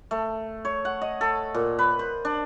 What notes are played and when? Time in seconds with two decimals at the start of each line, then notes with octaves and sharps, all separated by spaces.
0.11 A3
0.65 C#5
0.85 F#5
1.01 D#5
1.21 A4
1.54 A#2
1.79 B4
1.99 C5
2.25 D4